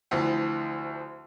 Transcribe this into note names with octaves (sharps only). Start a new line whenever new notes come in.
D2 E3 F3